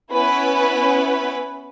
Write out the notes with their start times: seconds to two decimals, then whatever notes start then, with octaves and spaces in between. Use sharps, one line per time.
0.13 B3 C#4 E4 B4